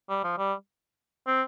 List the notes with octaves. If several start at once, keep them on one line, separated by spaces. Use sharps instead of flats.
G3
F3
G3
C4